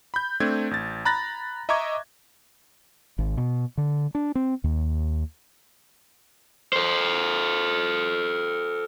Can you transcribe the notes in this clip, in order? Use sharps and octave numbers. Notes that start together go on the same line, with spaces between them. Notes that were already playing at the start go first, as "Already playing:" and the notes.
B5 G6
A3 C4 D4 G#6
A1 A6
A#5 B5 F#6 A6 A#6
D#5 E5 A#5 C#6 D6 G#6
G#1
B2
D3
D4
C4
D#2
A4 C5